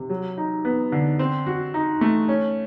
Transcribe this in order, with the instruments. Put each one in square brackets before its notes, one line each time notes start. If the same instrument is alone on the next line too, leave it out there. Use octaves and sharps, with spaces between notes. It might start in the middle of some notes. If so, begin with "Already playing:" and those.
Already playing: [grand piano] C3
F#3
D#4
B3
D3
C4
F#4
D#4
A3
C#4